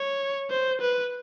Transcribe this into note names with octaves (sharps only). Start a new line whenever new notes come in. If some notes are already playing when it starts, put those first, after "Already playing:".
Already playing: C#5
C5
B4